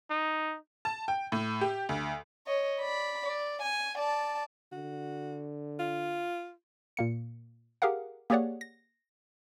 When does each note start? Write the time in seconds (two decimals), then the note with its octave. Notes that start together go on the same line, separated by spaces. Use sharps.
0.10 D#4
0.85 A5
1.08 G5
1.32 A2
1.61 G4
1.89 D2
2.47 C#5 D#5
2.80 D5 B5
3.26 D5
3.62 G#5
3.98 D5 A5
4.72 D3 F#4
5.79 F4
6.97 A#2 A#3 C#7
7.82 G4 G#4 A#4 F5 F#5
8.30 A#3 G4 G#4 C#5 D5 F#5
8.61 A#6